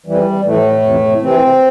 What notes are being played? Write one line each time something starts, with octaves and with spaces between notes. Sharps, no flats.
F2 E3 G3
F2 A2 E3 A3
F2 C3 E3
F2 C3 E3 C4